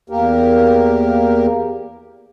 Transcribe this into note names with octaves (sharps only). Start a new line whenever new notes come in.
E2 A#3 G4 A#4